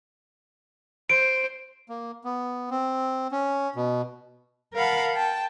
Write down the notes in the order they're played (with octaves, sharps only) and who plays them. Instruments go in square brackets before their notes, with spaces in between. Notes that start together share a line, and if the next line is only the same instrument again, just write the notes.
[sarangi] C5 [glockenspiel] D7
[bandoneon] A#3
B3
C4
C#4
B2
[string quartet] A#4 F5 F#5 A5 B5
G5 A5